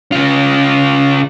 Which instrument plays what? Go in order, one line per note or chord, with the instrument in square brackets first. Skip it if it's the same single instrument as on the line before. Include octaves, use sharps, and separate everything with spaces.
[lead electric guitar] C#3 F4